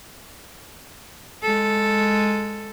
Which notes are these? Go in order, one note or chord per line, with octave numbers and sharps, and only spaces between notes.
G#3 A4